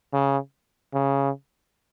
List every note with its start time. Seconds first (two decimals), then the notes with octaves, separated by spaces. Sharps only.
0.13 C#3
0.94 C#3